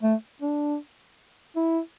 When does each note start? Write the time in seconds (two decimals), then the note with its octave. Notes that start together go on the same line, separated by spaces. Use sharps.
0.03 A3
0.41 D4
1.56 E4